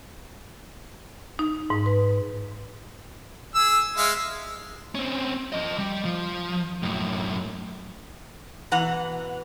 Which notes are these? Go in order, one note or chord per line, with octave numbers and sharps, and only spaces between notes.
D#4
G#2
B4
G#4 E6
G#3 E5 F5
C4 C#4
F3 D#5
G3
F3
F#2 A2
B2 E3 F#5 A#5